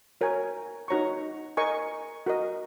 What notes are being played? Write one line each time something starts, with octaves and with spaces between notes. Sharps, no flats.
F#4 A#4 C#5 G#5
D#4 F#4 C#5 A#5 C#6
A#4 D#5 G#5 C#6
F#4 A#4 D#5